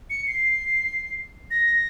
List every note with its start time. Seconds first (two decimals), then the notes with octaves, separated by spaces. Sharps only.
0.10 C#7
0.27 C7
1.51 A#6